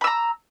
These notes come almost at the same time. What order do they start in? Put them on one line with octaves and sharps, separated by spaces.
B5 E6 A#5